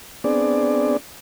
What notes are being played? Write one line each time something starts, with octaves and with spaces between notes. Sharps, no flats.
B3 C4 D4 G#4 D5